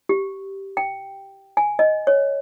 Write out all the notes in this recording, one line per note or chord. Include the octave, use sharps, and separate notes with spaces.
G4
G5
G#5
D#5
C#5